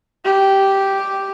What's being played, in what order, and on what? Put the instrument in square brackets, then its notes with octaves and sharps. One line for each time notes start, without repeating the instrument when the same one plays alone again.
[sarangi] G4